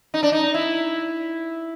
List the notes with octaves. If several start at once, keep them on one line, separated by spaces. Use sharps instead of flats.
D#4
D4
D#4
E4